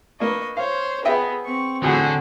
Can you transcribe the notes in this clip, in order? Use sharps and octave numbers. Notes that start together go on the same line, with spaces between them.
A#3 D4 B4 D#5 C#6
C5 C#5 F5
B3 G#4 D#5 E5 G5
C4 C#6
E2 A2 D3 F#3 F#4 G#4